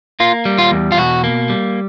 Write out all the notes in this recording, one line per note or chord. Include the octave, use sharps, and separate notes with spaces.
A#3 F4
G3
F4
E2
F4
B2 F#4
A#3
G3